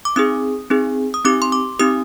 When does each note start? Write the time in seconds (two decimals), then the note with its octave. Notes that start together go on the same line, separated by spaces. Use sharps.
0.05 D6
0.16 C4 D#4 G#4 D#6
0.70 C4 D#4 G#4
1.14 D#6
1.25 C4 D#4 G4 D6
1.42 C6
1.52 D6
1.79 C4 D#4 G4 D#6